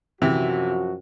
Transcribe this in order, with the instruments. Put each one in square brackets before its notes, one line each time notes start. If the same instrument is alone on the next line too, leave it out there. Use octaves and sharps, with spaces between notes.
[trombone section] F#2 F3 F#4 [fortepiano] C3 E3